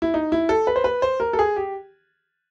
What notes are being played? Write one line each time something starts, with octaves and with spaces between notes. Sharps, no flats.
E4
D#4
E4
A4
B4
C5
B4
C5
A#4
A4
G#4
G4